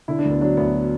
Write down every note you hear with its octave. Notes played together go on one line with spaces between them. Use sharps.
D3 E4
D4
D2
B3
F#3 D4
D2 B3